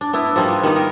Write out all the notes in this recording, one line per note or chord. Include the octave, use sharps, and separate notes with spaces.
D4
B3 D4 E4
F3 G3 A#3 D#4
B3
D#3 G3 B3 D#4
A#4